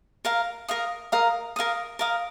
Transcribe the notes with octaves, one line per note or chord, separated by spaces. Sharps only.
A#4 F5 A#5
A#4 F5 D#6
A#4 F5 D#6
A#4 F5 D#6
A#4 F5 D#6